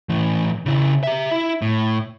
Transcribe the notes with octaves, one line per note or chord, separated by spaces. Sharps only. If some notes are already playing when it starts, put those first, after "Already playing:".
A2 E3
C#3 E4
G4 E5
E4
A2